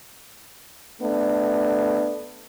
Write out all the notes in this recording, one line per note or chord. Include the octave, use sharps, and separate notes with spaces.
A3 B3 D4